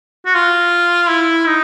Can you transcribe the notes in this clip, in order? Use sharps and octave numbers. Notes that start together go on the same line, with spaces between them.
F#4
F4
E4
D#4